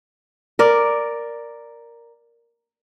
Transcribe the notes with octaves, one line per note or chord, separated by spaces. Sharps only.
A#4 D5